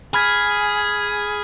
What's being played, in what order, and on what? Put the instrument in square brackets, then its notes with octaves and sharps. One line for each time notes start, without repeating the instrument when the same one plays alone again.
[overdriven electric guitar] G#4 [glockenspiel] G#5 B5 F6 G#6 B6